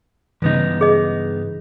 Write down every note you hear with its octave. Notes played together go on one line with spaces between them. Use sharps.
G2 C#3 E3 B3 D#4
G#4 D#5